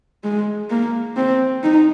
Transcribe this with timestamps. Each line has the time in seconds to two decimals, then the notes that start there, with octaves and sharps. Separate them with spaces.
0.24 G#3
0.70 A#3
1.16 C4
1.63 D#4